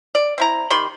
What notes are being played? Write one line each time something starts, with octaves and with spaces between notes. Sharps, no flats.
D5
C4 E4 A#5
D#3 G4 B5 C6